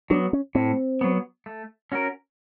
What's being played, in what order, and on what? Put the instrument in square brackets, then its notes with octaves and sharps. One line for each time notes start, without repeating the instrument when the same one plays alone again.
[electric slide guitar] F#3 [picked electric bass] D4
[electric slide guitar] B3
[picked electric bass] C#4
[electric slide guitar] A2 [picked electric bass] C4
[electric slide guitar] F#3 B3
A3
C#4 F#4 A#4